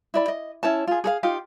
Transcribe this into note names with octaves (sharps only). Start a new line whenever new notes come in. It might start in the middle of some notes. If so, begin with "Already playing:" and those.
E4 D5 B5
D#5
C#4 E4 C#5 A5
F4 G#4
G#4 A4 F5
D#4 F4 G4 F5